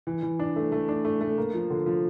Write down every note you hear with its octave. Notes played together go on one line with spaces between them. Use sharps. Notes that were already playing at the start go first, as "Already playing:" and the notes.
E3
E3
D4
A3
A3
D4
A3
A3
A#3
F3
D3
F3